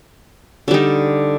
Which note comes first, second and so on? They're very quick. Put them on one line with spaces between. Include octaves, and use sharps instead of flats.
D3 G3 D#4